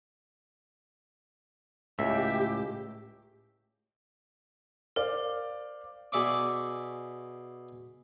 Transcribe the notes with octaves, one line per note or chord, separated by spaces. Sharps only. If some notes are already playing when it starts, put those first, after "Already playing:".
C#2 A2 G4 E5
A#4 C5 D5 F5
B2 G#4 D5 E5 C#6 D6